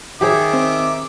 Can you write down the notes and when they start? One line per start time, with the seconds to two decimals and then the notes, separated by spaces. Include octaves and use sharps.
0.21 D#3 G4 G#4 C#5 E5 D6
0.53 C4